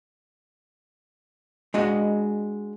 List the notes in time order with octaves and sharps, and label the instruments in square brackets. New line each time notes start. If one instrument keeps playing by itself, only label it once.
[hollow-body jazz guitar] G#3 D4 F#4 D#5